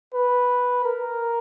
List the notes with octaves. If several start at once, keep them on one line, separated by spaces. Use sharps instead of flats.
B4
A#4